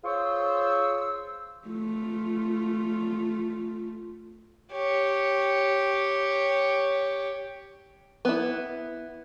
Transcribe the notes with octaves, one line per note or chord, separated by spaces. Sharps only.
F4 G#4 C5 C#5 C#6 E6
A3 F4
G4 C#5
B3 E4